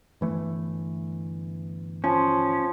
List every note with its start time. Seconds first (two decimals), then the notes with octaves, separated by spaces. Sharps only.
0.21 G1 E3 A3
2.04 F3 C#4